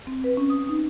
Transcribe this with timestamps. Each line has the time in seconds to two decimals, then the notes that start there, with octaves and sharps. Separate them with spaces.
0.07 C4
0.24 B4
0.37 C#4
0.50 D#6
0.69 D#4